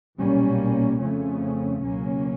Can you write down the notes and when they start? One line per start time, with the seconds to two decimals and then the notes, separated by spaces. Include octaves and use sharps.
0.19 B1 A#2 G3 A#3 C#4
1.02 F2 C#3 F3 A3 C#4
1.83 C#2 B2 F#3 A#3 C#4